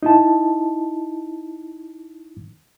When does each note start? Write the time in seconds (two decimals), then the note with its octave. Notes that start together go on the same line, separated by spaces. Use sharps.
0.03 D#4 E4 A5